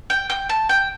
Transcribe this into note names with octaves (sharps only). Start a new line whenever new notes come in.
G5
G5
A5
G5